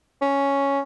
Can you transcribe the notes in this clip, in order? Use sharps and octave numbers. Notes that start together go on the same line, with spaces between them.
C#4